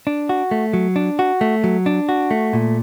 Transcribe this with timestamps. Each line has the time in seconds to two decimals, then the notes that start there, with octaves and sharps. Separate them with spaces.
0.07 D4
0.29 F#4
0.51 A3
0.73 F#3
0.96 D4
1.19 F#4
1.41 A3
1.64 F#3
1.86 D4
2.09 F#4
2.31 A3
2.53 A#2